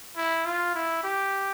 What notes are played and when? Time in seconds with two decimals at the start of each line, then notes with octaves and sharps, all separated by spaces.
0.17 E4
0.46 F4
0.74 E4
1.03 G4